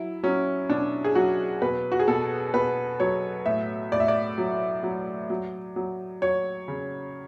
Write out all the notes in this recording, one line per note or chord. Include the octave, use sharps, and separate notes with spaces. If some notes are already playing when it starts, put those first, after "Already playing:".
Already playing: F#3 E4
F#3 C#4
B2 D4
G#4
F#3 F#4
B2 B4
F#4
G#4
B2 A4
B2 B4
F#3 C#5
A2 E5
A2 D5
E5
D5
F#3
F#3
F#3
F#3
F#3 C#5
C#3